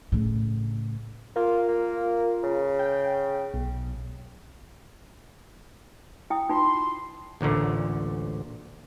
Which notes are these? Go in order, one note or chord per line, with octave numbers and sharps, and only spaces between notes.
A2 C#3
A#3 F4 A#4
A#3
C#3
G5
B1
E4 G5 D#6
D#4 F4 C6
A1 D2 A#2 D3